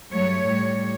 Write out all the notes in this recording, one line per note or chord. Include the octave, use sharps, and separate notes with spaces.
G2 F#3 A3 C#5
A2 G3